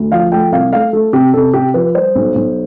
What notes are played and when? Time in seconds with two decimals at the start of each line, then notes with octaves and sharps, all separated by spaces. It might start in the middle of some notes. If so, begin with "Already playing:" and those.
Already playing: D2
0.12 F3 F5
0.32 A3 G5
0.52 C2 F5
0.73 A3 F5
0.93 A3 A4
1.13 C3 G4
1.34 C3 A4
1.54 C3 G4
1.74 F3 B4
1.94 G3 C5
2.15 B1
2.35 B1